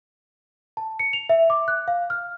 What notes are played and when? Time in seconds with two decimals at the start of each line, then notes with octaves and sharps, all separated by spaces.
0.77 A5
0.99 C#7
1.13 F7
1.29 E5
1.50 D6
1.68 F#6
1.88 F5
2.10 F6